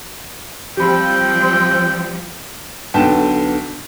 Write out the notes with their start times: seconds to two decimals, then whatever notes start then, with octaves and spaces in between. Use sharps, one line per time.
0.77 F3 G3 C4 G4 G5 B5
2.94 B1 D3 B3 G5 A5 E7